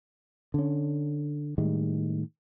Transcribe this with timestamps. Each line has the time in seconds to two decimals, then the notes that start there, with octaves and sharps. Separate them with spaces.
0.54 D3 C#4
1.58 A2 D#3 G3 G#3